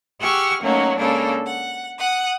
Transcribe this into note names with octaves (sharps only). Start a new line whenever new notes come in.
G4 G#4 F#5 C#6 E6 F6
F#3 A3 A#3 C#4 D#4
C#3 G#3 A#3 D4 A4
F#5
F#5 D#6